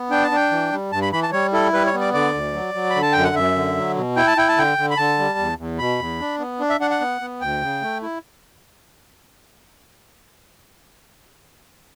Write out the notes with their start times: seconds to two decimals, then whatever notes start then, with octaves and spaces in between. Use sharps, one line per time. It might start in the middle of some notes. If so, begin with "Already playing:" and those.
Already playing: B3
0.10 D4 G5
0.24 A5
0.31 D4 G5
0.51 E3
0.72 G3
0.92 G2 A5
1.02 B5
1.12 E3 B5
1.23 A5
1.32 G3 C#5
1.53 E4 A4
1.73 G3 B4
1.86 C#5
1.94 B3
2.01 D5
2.13 D3 D5
2.34 D2
2.54 F#3
2.74 F#3
2.90 B5
2.95 D3
3.02 A5
3.13 F#2 G5
3.24 F#5
3.35 F#2 E5
3.56 D3
3.77 F#3
3.96 B2
4.16 E4 G5
4.27 A5
4.37 E4 G5
4.48 A5
4.57 D3 G5
4.78 D3
4.91 B5
4.97 D3 A5
5.19 G3
5.38 E2
5.58 E2
5.79 B2 B5
6.00 E2
6.20 D4
6.39 B3
6.60 D4
6.70 E5
6.80 D4 F#5
6.91 F#5
7.01 B3
7.21 B3
7.41 D2 G5
7.61 C#3
7.82 A3
8.02 E4